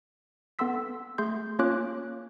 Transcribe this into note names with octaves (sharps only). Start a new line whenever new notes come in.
B3 A4 F#5 C6 E6 B6
A3 G#4 C6 G6
A#3 C#4 F4 C#5 D6 F#6